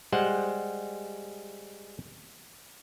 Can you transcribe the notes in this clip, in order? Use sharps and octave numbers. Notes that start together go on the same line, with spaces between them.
G3 G#3 C5 F#5